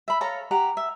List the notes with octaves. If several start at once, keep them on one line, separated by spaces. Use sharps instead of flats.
E5 B5
A4 C#5 F5 A#5
G4 F#5 A#5
E5